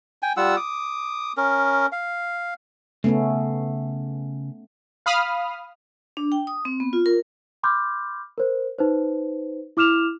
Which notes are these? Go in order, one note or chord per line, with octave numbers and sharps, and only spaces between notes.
G5 G#5
G3 F4 F#5 E6
D6 D#6
C#4 A#4
F5
C#3 A3 B3 C#4
F5 B5 D#6 F6
D4
G5
D#6
C4
B3
F4
A#4
B5 C6 D6 F6 G6
A#4 C5
D#4 B4 C5
E4 D6 F6 E7 F7